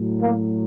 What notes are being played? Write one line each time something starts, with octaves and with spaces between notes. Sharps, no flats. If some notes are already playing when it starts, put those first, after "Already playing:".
Already playing: A2 F#3
A#3